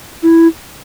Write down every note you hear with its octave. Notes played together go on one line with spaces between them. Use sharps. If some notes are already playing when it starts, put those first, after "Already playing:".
E4